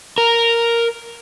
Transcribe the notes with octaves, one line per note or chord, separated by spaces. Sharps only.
A#4